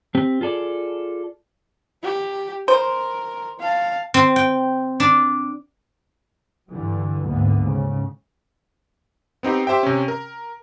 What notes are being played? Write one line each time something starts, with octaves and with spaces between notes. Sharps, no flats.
C4 G4
F4 G#4 A4 D5
G4
A#4 C5
F5 A5
C4
G5
D4
G2 D3 E3 G3
D2 G#2 D3 A#3 B3
G#2 C#3
B3 C4 D#4 G4
G4 C5 E5 G5
C3 C#4
A#4